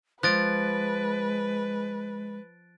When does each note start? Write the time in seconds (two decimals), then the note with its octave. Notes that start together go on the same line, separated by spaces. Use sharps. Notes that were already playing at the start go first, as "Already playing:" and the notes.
0.23 F3 G#3 B4 F#6 A6 D7